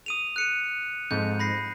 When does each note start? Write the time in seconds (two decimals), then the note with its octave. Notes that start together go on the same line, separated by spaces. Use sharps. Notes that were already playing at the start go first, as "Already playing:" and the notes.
0.06 D#6 D#7 F7
0.36 F#6 C#7 D#7
1.11 F2 G#2 G6
1.40 B5 A#6 C7